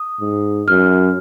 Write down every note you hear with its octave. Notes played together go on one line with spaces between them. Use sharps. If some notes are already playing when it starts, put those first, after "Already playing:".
Already playing: D#6
G#2
F#2 F6